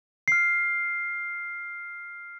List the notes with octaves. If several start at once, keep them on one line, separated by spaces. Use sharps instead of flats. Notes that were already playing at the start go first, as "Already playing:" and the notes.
F6 C7